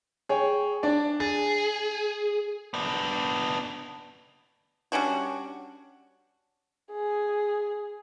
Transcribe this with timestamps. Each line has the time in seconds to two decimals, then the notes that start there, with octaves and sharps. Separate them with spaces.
0.29 G#4 C#5 G5
0.83 D4 D5
1.20 G#4 A6
2.74 B3 D4
4.92 G3 C#4 D4 F#4
6.92 G#4